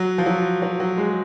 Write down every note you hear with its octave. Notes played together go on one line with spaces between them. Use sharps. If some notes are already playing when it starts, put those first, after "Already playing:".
Already playing: F#3
F3
F#3
F#3
F#3
G#3